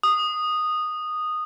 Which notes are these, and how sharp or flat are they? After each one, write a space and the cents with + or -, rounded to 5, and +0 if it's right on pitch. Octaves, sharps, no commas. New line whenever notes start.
D#6 -10